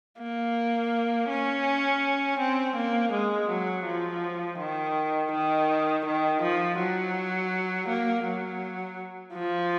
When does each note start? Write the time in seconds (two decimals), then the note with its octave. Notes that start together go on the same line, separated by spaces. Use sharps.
0.19 A#3
1.29 C#4
2.39 C4
2.76 A#3
3.12 G#3
3.49 F#3
3.86 F3
4.58 D#3
5.32 D#3
6.05 D#3
6.41 F3
6.78 F#3
7.88 A#3
8.24 F#3
9.34 F3